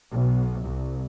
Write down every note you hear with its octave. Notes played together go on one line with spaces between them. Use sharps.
B1
C2